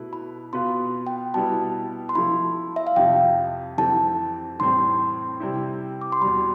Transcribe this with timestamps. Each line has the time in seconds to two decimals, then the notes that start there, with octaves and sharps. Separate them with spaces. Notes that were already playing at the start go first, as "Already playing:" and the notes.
Already playing: B2 A3 E4 B4
0.13 B5
0.53 B2 B3 F4 B4 C6
1.07 G5
1.34 B2 G3 B3 E4 A5
2.09 C6
2.15 F3 A3 E4 B5
2.76 E5
2.87 F5
2.96 F2 C3 F3 G5
3.78 F2 E3 A3 C4 G4 A5
4.59 A2 E3 G3 C4 C6
5.40 C3 G3 C4 E4
6.01 D6
6.12 C6
6.21 E2 B2 G3 B5